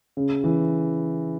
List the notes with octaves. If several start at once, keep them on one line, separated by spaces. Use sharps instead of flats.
C#3
E3